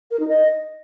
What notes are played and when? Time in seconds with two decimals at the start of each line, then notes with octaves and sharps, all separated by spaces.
0.11 A#4
0.19 D#4
0.28 D#5